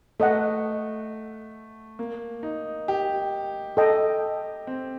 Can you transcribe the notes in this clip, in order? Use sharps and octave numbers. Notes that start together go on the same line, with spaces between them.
A3 A4 D#5 F#5
A#3
D#4
G4
A4 D#5 G5
C4